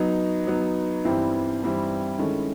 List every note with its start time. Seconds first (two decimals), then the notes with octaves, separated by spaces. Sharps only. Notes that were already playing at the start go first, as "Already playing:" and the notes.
Already playing: F#3 B3 D#4
0.47 F#3 B3 D#4
1.04 G2 E3 G3 C4 E4
1.62 G2 E3 G3 C4 E4
2.18 D#3 G#3 C#4 E4 A4